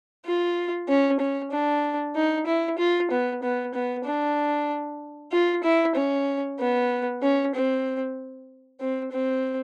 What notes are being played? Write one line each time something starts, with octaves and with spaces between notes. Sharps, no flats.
F4
C#4
C#4
D4
D#4
E4
F4
B3
B3
B3
D4
F4
E4
C#4
B3
C#4
C4
C4
C4